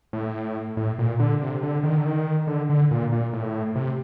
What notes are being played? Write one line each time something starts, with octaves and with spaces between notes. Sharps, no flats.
A2
A2
A#2
D3
C3
D3
D#3
D3
D#3
D3
D3
A#2
A#2
A2
C3